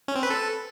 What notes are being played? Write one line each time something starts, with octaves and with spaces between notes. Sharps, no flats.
C#4
C4
B4
A4